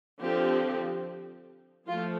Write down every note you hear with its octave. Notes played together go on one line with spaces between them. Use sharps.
D3 F3 C4 G4
F3 A3 F4